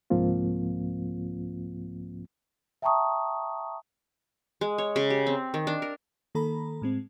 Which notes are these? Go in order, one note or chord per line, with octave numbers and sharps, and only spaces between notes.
C2 G#2 F3 A#3 C4 F4
E5 G5 A5 A#5 C#6 D#6
G#3
C#5
C#3
G4
C4
D#3
D4
A#4
D#3 A#3 A4 A#5 B5
A2 G#3 C4